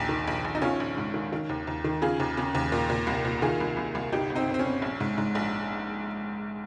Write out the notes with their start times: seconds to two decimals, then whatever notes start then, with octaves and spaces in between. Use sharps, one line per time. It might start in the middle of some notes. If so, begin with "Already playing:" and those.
Already playing: A#1 D#2
0.09 D#3
0.27 A#1
0.44 A#1
0.55 D#4
0.62 D#3 C#4 F4
0.80 A#1
0.97 G#2
1.14 D#3
1.33 D#3
1.49 D#2
1.67 D#2
1.84 D#3
2.02 C#3 F4 G#4
2.20 D#2
2.37 C#3
2.55 D#2
2.72 A#2
2.90 A#2
3.07 C2
3.25 A#2
3.42 D#3 F4 G#4
3.60 C2
3.77 C2
3.95 C2
4.12 G1 D#4 G4
4.30 G1
4.35 C4 D#4
4.47 G1
4.54 C4
4.59 C#4
4.65 G1
4.82 A#1
5.00 G#2
5.18 G#2
5.35 A#1